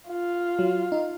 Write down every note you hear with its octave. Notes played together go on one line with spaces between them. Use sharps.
F4
F#3
D#4